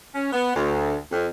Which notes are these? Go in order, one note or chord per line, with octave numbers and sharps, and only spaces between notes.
C#4
B3
D2
F2